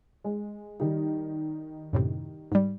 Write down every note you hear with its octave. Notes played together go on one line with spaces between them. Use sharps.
G#3
D#3 G3 D#4
F#2 A2 C3
G#2 G3